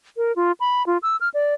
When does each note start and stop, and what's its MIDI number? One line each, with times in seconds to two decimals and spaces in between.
0.17 0.35 70
0.36 0.52 65
0.60 0.85 83
0.86 0.98 65
1.03 1.17 88
1.21 1.29 89
1.34 1.54 74